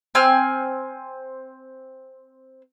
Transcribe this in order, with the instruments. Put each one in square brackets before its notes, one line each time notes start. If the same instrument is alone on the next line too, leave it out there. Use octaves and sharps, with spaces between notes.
[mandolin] C4 G#5 F6